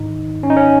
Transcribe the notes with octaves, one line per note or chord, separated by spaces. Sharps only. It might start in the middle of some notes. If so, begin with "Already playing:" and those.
Already playing: G#2 D#3 D#4
C#4
D#4
C#4